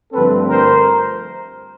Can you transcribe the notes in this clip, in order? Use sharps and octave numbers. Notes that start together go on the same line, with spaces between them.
G2 D3 F3 A3 C4 A4 B4
A#4 C5